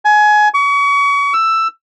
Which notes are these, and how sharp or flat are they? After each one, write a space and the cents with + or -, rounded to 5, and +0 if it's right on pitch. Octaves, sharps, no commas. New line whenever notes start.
G#5 +20
C#6 +35
E6 +10